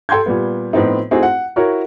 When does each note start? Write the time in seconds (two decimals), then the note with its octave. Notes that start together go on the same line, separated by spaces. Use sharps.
0.09 A4 G5 C6 G6 G#6
0.26 A#2 G3 B3
0.73 A2 F3 B3 C4 D#4
1.11 A3 C4 D#4 E4 F#4 G#4
1.23 F#5
1.56 E4 F#4 A#4 C#5